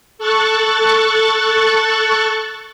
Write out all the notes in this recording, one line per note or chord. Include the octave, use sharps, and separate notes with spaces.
A4 C#6 F#6 A6